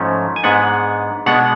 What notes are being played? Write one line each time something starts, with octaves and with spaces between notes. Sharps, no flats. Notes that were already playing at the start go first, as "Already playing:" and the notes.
Already playing: G#2 F3 A3 C#4
G#5
G#2 G#3 B3 D4 F#5
B2 G#3 B3 D4 F#5